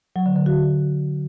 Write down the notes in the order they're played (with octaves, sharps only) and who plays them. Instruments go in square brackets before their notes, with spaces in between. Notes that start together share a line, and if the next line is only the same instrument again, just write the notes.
[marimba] F#3
D3
D3
F#4